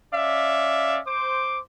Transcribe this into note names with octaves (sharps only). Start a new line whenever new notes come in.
C#4 D5 E5 F5
C5 D6